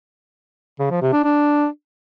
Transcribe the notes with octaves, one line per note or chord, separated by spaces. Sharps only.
C#3
F3
C3
D4
D4